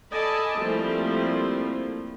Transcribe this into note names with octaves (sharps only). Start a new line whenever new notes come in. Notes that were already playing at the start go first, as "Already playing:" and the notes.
A4 D5 D#5 G#5 A5 B5
F3 G3 A3 A#3 C4 E4